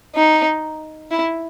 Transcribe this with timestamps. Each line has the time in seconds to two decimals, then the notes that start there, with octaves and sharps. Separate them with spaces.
0.15 D#4
1.11 E4